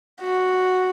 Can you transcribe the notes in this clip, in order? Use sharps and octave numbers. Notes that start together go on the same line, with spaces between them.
F#4